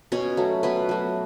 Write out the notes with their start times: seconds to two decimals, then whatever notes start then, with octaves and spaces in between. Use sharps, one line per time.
0.12 B2 C#4 C#5
0.37 F#3 A3
0.63 B2 B3 B4
0.89 F#3 A3